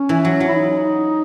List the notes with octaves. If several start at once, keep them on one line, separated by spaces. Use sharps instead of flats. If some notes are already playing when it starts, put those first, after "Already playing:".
Already playing: C#4
E3
F#3
F#3
E4
D#4